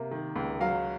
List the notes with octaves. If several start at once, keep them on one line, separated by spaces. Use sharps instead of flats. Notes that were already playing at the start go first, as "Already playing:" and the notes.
Already playing: C3 A#3
D#3
C#2
F#3 F5